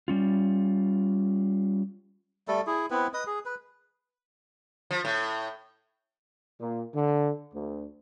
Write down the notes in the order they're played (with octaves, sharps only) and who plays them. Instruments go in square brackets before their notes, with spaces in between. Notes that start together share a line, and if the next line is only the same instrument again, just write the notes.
[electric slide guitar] G3 C#4 F4
[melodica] G3 A3 A4
E4 G#4
B3 C4 E4 B4
B4 D#5 D#6
G#4
B4
[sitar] F3
A2
[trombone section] A#2
D3
D2